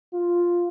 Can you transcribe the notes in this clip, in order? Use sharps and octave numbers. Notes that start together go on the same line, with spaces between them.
F4